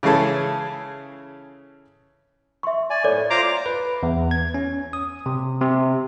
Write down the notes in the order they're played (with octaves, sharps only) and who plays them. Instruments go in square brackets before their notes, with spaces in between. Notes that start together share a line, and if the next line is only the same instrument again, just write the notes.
[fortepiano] C#3 E3 C#4 G#4 A4
[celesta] E5 C#6 [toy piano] C6
[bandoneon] D5 G#5
[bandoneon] A2 [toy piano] A4 C#5 D5
[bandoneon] F4 [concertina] C5 A#5 D6
[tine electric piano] B4
E2
G#6
C#4
D#6
C3
C3